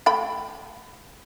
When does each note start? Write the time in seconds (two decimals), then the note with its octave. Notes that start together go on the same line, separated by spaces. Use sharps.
0.06 A3 G5 B5